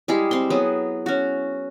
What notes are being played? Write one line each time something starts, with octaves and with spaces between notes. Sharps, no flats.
G3 G#3 E4 G#4
C4 C6
F#3 B3 G#4
C#4 F#4